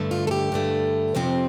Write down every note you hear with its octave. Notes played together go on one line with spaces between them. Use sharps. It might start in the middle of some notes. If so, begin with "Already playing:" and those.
Already playing: G2 D3 A3
F4
A4
G4
G2 D3 A3
F2 C3 F3 C4